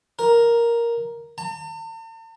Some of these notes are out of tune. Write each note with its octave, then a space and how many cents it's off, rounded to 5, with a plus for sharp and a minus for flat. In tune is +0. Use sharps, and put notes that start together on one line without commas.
A#4 +5
A5 +45